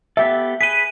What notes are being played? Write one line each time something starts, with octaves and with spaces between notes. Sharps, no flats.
B3 G4 A4 E5
G#4 B4 B6 D#7